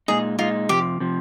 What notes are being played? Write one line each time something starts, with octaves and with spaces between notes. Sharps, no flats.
A#2 G#3 D#4 G#4
A#2 G#3 D#4 F4
F2 C3 F3 G4
C3 F3